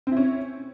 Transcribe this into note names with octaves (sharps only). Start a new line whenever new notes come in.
C4 C#4 E4